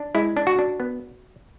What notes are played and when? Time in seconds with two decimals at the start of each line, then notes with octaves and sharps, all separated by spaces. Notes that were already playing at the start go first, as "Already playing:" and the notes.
Already playing: D4
0.15 G#3 E4
0.37 D4
0.47 F#4
0.59 D4
0.80 B3